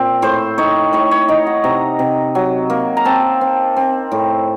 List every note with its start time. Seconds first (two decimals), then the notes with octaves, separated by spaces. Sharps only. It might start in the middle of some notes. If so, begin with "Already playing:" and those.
Already playing: A#2 C4
0.22 A2 C5
0.58 D#4 C#5
0.93 A2 C#5
1.11 C#5
1.28 D#4 D#5
1.47 F#5
1.64 C3 A#5
1.99 C3
2.35 F#3
2.70 A#3
2.97 A#5
3.05 C4 A5
3.41 C4
3.77 C4
4.12 A2